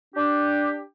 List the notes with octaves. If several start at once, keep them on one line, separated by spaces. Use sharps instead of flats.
D4 G4